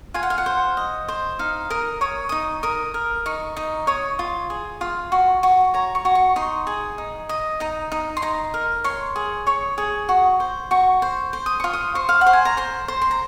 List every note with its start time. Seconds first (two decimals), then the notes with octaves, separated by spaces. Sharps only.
0.14 F4 G#5
0.23 F#5
0.30 F5
0.38 F#5
0.46 C5
0.77 D#5
1.08 C5
1.39 D#4 F5
1.70 A#4 D#6
2.01 C#5 D#6
2.29 D#4 D#6
2.63 A#4 D#6
2.94 A#4
3.26 D#4 C#6
3.57 D#4
3.87 C#5 D#6
4.19 F4
4.50 G#4
4.81 F4
5.12 F#4
5.43 F#4
5.74 C#5 A#5
5.95 C#6
6.05 F#4
6.15 C#6
6.36 D#4 C6
6.67 G#4
6.98 D#4
7.29 D#5
7.60 D#4 A#5
7.92 D#4
8.17 C6
8.22 D#4 A#5
8.54 A#4
8.84 C#5 C6
9.16 G#4
9.47 C#5 C#6
9.78 G#4
10.09 F#4
10.40 C5
10.71 F#4 C#6
11.02 C5
11.33 C5
11.46 D#6
11.60 F4 C#6
11.73 D#6
11.95 C5 C#6
12.09 F5
12.21 F#5
12.26 C5
12.33 G#5
12.45 A#5
12.57 C5 C6
12.88 C5
13.02 C6
13.11 A#5